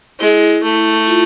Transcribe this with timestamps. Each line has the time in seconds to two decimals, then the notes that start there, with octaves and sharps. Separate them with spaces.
0.20 G#3 E4
0.64 A3
1.07 F4